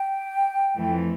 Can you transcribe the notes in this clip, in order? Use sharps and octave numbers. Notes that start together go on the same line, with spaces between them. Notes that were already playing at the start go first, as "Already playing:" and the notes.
Already playing: G5
F2 E3 A3